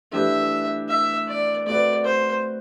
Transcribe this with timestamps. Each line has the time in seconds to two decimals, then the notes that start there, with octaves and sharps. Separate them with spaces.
0.13 E3 A3 D4 G4 B4 E5
0.89 E5
1.28 D5
1.66 A3 C4 F#4 B4 D5
2.05 C5